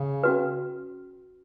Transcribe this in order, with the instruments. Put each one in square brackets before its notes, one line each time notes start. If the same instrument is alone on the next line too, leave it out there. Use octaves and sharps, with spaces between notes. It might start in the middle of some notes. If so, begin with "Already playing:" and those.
Already playing: [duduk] C#3
[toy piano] C#4 F#4 B4